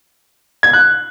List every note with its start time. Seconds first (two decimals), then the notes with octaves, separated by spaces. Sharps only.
0.63 G#6
0.73 F#6